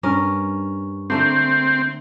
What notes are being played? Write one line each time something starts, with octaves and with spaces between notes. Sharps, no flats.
G2 C#4 A#4
D3 A3 A#3 C4